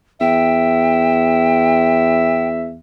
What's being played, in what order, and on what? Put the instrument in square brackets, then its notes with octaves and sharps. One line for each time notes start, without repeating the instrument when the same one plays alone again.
[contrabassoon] E2 [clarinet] E5 [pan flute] G5